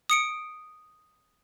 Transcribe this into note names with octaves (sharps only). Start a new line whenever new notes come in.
D#6 C#7 D7